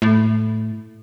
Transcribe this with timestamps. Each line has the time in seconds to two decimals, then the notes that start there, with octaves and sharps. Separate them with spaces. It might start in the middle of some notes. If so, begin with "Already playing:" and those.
0.02 A2